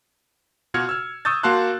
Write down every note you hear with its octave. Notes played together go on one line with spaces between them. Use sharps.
B2 F4 F#4 F6 G#6 C#7
E6 F6
C#6 D#6 E6 G6 A6
A#3 F#4 F5 A5 C6 F#6